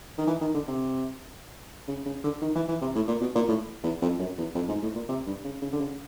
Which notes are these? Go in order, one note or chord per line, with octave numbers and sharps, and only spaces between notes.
D#3
E3
D#3
D3
C3
C#3
C#3
D3
D#3
E3
E3
C3
A2
A#2
B2
A#2
A2
E2
F2
F#2
E2
F2
G#2
A2
A#2
C3
G2
C#3
C#3
D3
C#3